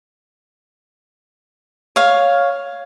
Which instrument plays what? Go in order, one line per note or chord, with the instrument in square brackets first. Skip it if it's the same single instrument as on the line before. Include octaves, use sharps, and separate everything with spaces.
[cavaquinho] C#5 F5